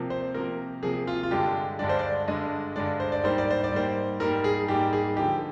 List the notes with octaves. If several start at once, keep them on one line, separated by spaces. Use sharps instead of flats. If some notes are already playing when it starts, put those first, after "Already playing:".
Already playing: C3 F3 A#3
C5
C3 F3 A#3 A#4
C3 F3 A#3 G#4
F4
F4
G2 D3 G#3 D4 G4
G2 D3 G#3 D4 D5
C5
D5
G2 D3 G#3 D4 D#5
G2 D3 G#3 D4 D5
C5
D5
G#2 G3 A#3 C5
D5
C5
D5
G#2 G3 A#3 C5
G#2 G3 A#3 A#4
G#4
G#2 G3 A#3 G4
G#4
D3 F3 A#3 D#4 G4